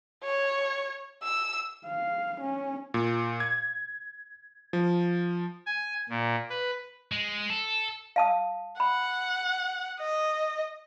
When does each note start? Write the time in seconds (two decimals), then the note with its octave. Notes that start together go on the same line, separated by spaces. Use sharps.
0.24 C#5
1.24 E6
1.86 F5
2.40 C#4
2.94 A#2
3.40 G#6
4.73 F3
5.66 G#5
6.09 A#2
6.50 B4
7.12 G#3
7.50 A4
8.16 F5 A5 D#6
8.80 F#5 B5
10.00 D#5